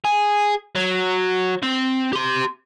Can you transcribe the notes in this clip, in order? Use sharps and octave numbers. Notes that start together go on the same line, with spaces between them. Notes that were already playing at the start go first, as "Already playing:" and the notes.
G#4
F#3
C4
G4 C6